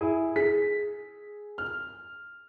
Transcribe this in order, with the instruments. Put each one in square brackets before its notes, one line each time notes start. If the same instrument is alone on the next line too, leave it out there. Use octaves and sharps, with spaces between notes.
[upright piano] E4 G#4
[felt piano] G#4 [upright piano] B6
[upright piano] F6